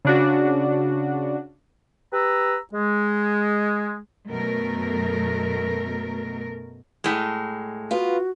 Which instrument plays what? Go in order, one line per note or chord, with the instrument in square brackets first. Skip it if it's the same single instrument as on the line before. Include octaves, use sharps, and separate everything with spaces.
[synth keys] C#3 D4 F#4
[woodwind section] G4 B4 A#5 E6
G#3
[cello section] F#2 B2 A3 A#4
[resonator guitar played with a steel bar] A2 G#3
[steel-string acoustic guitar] B3 F4 [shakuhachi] F#4